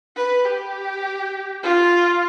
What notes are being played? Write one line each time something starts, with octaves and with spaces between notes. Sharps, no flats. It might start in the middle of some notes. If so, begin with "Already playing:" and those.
B4
G4
F4